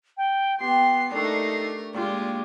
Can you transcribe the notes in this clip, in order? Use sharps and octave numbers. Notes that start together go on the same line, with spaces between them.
G5
B3 G4 C6 C7
A3 D4 D#4 A4 A#4 C#6
A#2 G#3 F4 G4